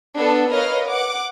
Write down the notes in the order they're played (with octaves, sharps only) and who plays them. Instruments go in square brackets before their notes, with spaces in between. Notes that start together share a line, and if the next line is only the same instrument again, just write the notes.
[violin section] B3 D4 A4
A#4 B4 C#5 D#5 F5 F6
F#5 D6